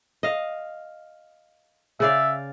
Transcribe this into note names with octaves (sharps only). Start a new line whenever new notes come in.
D#5 F5
C#3 D5 E5 F5